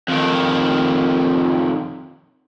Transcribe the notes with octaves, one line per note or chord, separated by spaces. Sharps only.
F2 D#3